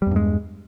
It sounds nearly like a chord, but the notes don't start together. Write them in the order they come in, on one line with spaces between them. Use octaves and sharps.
G3 E2 G2 G#3